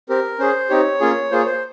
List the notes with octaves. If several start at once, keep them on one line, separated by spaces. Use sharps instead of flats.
C4 G4 A#4
C#4 G#4 C5
C4 D#4 G4 C#5
A#3 C#4 F4 G#4
A#3 F4 G#4 C5
C#5
C5